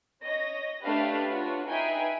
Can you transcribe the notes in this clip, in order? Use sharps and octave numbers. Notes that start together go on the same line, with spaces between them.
C#5 D#5 A#6
A3 D4 G4 B4 F5
D4 F4 F#4 B4 C#5
D#4 G#4 B4 E5 G5 G#5